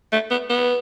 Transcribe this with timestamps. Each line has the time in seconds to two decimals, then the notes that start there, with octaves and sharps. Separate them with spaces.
0.12 A3
0.30 B3
0.50 B3